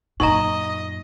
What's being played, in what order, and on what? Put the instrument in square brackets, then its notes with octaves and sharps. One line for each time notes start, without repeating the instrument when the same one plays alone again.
[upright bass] F#2 A#2 [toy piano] D#4 [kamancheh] D#5 [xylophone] A#5 C#6